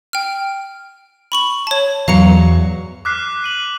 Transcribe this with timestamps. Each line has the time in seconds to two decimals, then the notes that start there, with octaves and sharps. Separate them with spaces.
0.13 G5 F6
1.32 B5 C#6 F#7
1.67 C#5 A5
2.08 E2 F#3 F5 A#5 C#7
3.05 D6 F6 F#6 B6 C7
3.44 D#7 F#7